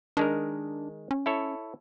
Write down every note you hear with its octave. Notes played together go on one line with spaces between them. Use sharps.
D#3 G#3 D4 A#4
C#4
E4 A4 C#5